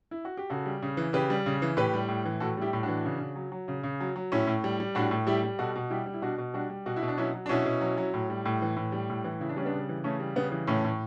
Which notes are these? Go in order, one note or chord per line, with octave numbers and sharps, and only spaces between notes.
E4
F#4
G4
C#3 F#4 A4
G3
C#3
E3
C#3 G4 B4
G3
C#3
E3
A2 G4 B4
G3
A2
E3
A2 F#4 A4
G3 E4 G4
A2
D4 F#4
E3
C#3
C#3
F#3
F#3
C#3
C#3
F#3
F#3
A2 C#4 E4
A2
G3
G3
A2 D4 F#4
A2
G3 E4 G4
G3
B2 F#4 A4
B2
G3 E4 G4
G3
E4
B2 D4 F#4
B2
G3 D4 F#4
G3
B2 F#4
E4
B2
D4
F#3 C#4 E4
F#3
D4
B2 C#4 E4
B2
F#3
F#3
A2
G3
A2
E3
A2
G3
A2
E3
C#3 E4
D4
G3 C#4
B3 D4
C#3
E3
C#3 A3 C#4
G3
C#3 B3
E3
A2 A3 C#4
A2